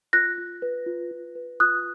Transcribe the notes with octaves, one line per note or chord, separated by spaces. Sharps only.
F4 F#6 A#6
F4
B4
F4
F4
B4
F4 D#6 F#6